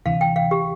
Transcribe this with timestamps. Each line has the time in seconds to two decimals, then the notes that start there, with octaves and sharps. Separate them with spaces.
0.06 D2 C3 E3 F5
0.21 G5
0.36 F5
0.51 G4